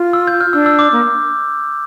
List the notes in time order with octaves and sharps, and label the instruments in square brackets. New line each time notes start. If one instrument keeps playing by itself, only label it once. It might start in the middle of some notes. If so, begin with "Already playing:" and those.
Already playing: [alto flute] F4
[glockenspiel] E6
G6
F6
[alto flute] D4 [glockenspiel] E6
[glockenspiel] E6
D6
[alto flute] A#3